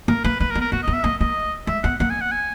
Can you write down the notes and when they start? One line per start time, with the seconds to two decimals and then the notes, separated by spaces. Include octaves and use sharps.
0.08 A#3 A#4
0.24 A#3 B4
0.40 A#3 B4
0.51 A#4
0.55 B3
0.61 A#4
0.72 A#3 F#4
0.83 D#5
0.87 B3
0.93 E5
1.04 A#3 D#5
1.20 A#3 D#5
1.67 G#3 E5
1.84 B3 F#5
2.00 A#3 F#5
2.10 G#5
2.21 F#5
2.32 G#5